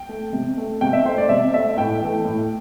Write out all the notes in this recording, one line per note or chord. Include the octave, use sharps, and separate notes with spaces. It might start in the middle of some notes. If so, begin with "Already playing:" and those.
Already playing: G5
A3
C3
A3
C3 G5
E5
A3 C5
D5
C3 E5
A3 E5
A2 G5
E3 A3
A2